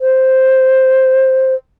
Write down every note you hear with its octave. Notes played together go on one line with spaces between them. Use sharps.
C5